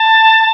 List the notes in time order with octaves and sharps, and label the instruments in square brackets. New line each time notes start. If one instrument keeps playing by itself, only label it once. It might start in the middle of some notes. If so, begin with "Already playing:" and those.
Already playing: [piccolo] A5